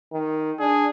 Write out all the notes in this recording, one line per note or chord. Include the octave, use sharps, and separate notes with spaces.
D#3
D4 G#4